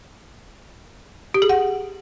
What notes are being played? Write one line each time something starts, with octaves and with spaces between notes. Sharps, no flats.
G4
G#4
F#5